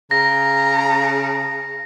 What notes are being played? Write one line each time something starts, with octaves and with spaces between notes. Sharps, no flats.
C#3 A#5 A#6